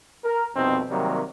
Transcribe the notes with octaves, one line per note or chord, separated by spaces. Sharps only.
A#4
C2 F2 B2 C4 D#4
C3 D#3 F#3 G3 A#3